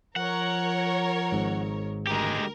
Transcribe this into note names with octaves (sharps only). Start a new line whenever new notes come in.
F3 A#4 C#5 F#5
G#1 G#2
D2 G#3 G4 A#4